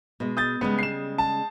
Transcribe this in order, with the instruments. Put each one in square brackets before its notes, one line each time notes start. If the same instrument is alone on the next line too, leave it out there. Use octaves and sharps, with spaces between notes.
[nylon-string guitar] B2 G#3
[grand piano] D#6 G6 A6
[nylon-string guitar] C#3 G3 G#3 [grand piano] B3
[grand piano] C7 E7
A5